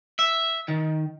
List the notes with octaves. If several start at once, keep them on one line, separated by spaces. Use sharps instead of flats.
E5
D#3